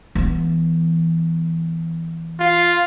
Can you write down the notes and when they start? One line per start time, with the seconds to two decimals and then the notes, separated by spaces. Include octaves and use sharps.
0.15 E3 B3
2.40 F4